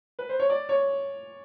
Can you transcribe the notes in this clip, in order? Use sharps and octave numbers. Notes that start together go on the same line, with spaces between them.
B4
C5
C#5
D5
C#5